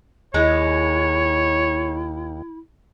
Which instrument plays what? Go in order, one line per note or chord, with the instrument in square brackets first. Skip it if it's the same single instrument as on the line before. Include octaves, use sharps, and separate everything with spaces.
[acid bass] D#2 [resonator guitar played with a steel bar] G#3 [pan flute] E4 [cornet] C#5